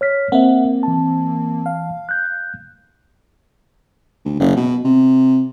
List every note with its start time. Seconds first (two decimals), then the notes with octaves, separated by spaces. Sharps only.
0.01 C#5 F6 B6
0.32 A#3 C4 E5 F#5
0.83 E3 A5
1.66 F5
2.09 F#6 G6
4.25 D2
4.40 F#1
4.57 B2
4.85 C3